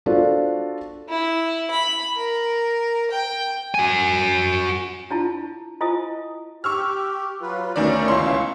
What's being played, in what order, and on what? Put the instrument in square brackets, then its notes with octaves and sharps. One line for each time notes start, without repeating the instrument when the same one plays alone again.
[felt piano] D4 F4 F#4 A4 C5 D5
[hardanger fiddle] E4
B5
A#4
G5
[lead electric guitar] F#4 G#5
[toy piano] D4 E4 F4 A5
E4 F4 D#5 G#5 A5 D#6
[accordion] G4 [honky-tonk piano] C#6 E6 F6
[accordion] F#3 F4 B4
[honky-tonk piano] D2 D#3 D5 [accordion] B2 C#4 C#6
[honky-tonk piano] C#2 E4 C6